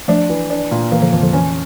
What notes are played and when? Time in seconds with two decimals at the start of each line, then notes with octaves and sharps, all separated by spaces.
0.08 F3 A3 D4
0.30 E3
0.50 D4
0.71 A#2
0.92 E3 A#3
1.02 D3 F3
1.12 F2 E3
1.22 D3 F3
1.33 E3 C#4